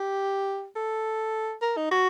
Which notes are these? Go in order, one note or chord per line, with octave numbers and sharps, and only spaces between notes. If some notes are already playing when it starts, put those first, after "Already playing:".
Already playing: G4
A4
A#4
D#4
F#4